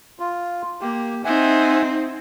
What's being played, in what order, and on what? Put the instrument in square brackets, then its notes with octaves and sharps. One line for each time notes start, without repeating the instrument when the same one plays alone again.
[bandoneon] F4
[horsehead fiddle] A#3 [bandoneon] G4
[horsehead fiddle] C4 D#4 [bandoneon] E5 F#5 G#5